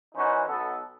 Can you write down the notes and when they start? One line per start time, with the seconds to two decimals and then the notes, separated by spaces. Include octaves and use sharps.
0.15 E3 C#4 D#4 F#4 C5
0.47 B1 B3 A4